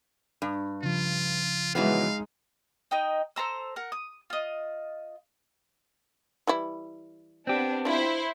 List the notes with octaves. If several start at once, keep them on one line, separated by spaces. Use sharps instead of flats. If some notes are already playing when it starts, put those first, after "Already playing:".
G2
C#3 F3 F4
E3 F#3 G#3 B3 D#4 F5
D#4 D#5 G5
A4 C5 A#5 E6
A#4 F#5
D#6
F4 D#5
E3 G3 E4
B3 C4 D4 G4
D4 E4 F4 C5